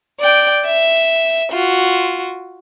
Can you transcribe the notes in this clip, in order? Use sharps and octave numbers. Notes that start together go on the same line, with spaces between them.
D5 G5
E5
F4 F#4